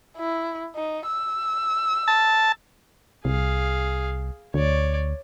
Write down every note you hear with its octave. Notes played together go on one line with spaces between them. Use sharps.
E4
D#4
E6
A5
C2 G#4 F5
D2 C#5 D5